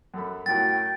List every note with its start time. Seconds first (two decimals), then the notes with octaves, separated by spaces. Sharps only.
0.14 F#2 A4 B5
0.46 F#2 A2 F#3 G5 A6